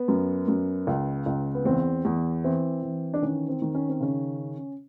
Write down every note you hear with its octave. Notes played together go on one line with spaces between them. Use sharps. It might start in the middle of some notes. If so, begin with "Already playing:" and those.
Already playing: B3
F#2
F#2
C#2
C#2
B3
E2 C4
E2
E3 C4
E3
D4
D#3 C#4
C4
D#3
C#4
C4
C#3 C#4